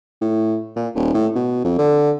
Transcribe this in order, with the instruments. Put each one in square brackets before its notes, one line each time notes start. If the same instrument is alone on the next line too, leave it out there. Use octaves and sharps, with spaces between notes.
[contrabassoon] A2
A#2
D#1
A2
B2
F2
D3